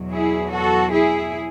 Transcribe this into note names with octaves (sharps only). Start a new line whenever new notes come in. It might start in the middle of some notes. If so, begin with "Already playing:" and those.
Already playing: E2 B2 F#3
E4 G#4
F#4 A4
E4 G#4